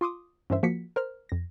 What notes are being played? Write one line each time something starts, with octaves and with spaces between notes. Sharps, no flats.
F4 C6 D6 D#6
G2 E3 C#4 A#4 C5 E5
F3 A#3 F#4 B6 C#7
A#4 C5 F6
F2 A#6